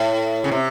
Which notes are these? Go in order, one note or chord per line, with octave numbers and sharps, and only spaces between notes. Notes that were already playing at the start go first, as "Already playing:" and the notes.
Already playing: A2
C#3
C3